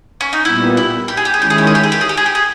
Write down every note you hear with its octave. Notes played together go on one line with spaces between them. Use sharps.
C#4
D#4
A#2 G3 B3 E4
E4
G4
G#4
G4
G#4
D#3 G#3 C#4 E4 G4
G#4
G4
G#4
G4
G#4
G4
G#4
G4
G#4
G4
G#4